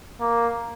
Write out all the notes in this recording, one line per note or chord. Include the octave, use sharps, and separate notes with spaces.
A#3